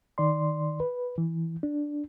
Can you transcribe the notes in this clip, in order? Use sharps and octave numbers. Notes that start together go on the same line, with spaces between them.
D#3 D5 C6
B4
E3
D4